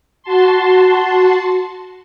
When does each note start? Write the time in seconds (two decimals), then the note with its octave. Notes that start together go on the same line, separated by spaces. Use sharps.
0.23 F#4 A5 C6